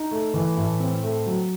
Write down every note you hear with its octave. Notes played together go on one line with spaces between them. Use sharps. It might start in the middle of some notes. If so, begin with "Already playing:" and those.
Already playing: D#4
A3
E3
A2
C4
A3
F#3